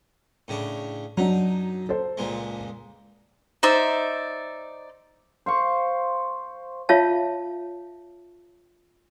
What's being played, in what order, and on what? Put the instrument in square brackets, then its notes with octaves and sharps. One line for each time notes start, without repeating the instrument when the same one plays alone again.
[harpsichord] A2 C#3 D4
[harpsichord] F#2 D#4 [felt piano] F#3 D4
[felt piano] A4 C5
[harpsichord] C#2 A#2 G#3
[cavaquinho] D#4 C5 D5 E5
[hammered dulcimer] C5 F5 C#6
[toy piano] F4 C#5 E5 F5 A5